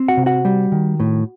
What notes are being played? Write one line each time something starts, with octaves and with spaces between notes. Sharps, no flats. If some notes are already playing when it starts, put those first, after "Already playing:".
Already playing: C4
F#4 F#5
C3
F#4 F#5
G3
D#3
A2